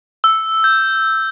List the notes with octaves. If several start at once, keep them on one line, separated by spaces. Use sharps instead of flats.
E6
G6